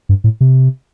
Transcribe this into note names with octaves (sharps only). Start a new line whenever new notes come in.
G2
A2
C3